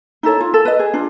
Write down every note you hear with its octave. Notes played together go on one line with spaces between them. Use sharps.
D#4 E4 A4 C#5
F4
A4
B4 D#5
G#4
D4 F4